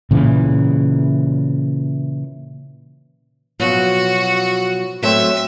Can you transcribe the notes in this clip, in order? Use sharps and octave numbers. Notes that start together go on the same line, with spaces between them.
A#2 C#3 E3
B2 F3 F#3 F#4
F#3 A3 C4 E5